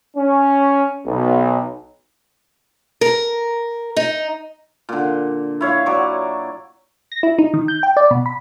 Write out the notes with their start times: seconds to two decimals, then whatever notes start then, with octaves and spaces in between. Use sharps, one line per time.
0.17 C#4
1.06 B1
3.01 A#4
3.97 D#4
4.89 A#2 D3
5.61 E4 C#5 F5
5.86 F#3 D5 C#6
7.12 A#6
7.23 E4
7.39 D#4
7.54 D#3
7.68 G6
7.83 G5
7.97 D5
8.11 B2
8.26 B5